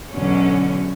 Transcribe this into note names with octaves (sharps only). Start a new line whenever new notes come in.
E2 B2 D3 F#3 C#4